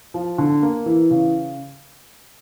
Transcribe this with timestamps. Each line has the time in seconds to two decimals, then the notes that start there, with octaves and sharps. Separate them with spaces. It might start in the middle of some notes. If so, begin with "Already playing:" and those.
0.14 F3
0.38 D3
0.62 A#3
0.86 E3
1.11 C#3